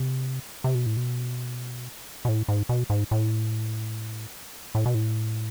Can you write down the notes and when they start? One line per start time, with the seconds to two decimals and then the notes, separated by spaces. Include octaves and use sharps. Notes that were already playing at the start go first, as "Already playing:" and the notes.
Already playing: C3
0.64 C3
0.75 B2
0.86 A2
0.97 B2
2.25 B2
2.29 A2
2.48 G#2
2.69 B2
2.90 G#2
3.11 A2
4.75 A2
4.86 B2
4.94 A2